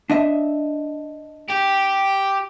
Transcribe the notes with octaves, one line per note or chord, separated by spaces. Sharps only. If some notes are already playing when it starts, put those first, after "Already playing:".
D4 D#5 E5
G4